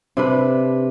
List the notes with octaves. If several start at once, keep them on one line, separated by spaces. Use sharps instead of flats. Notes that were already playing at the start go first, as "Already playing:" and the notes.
C3 D4 B4